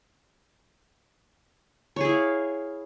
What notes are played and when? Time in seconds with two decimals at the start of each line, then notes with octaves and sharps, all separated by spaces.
1.96 C#5
2.01 G#4
2.05 E4
2.09 F5